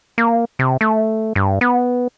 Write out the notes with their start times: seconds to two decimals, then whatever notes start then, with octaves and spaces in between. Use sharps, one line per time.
0.18 A#3
0.59 C3
0.81 A3
1.36 G2
1.61 B3